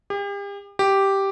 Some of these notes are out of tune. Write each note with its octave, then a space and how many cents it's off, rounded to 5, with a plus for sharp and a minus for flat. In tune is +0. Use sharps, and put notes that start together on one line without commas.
G4 +40
G4 -5